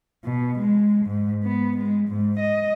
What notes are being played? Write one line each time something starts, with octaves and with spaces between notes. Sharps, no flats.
B2
G#3
G#2
B3
G#3
G#2
D#5